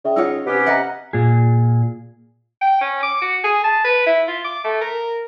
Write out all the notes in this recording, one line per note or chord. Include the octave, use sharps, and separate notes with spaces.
C#3 D5 E5 G5
D#4 F4 C#5 F#5 E6
C3 B3 C#4 G4
B4 D#5 E5 F#5 A#5
A#2 G#4
G5
C#4
D6
F#4
G#4
A5
B4
E4
F4
D6
A3
A#4